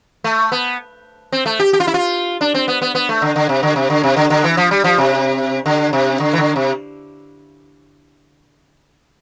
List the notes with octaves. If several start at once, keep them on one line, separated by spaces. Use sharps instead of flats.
A3
B3
C4
A3
G4
G4
F4
E4
F4
D4
C4
B3
B3
B3
A3
D3
D3
C3
D3
C3
D3
C3
D3
D3
E3
F3
G3
F3
C3
D3
C3
D3
E3
D3
C3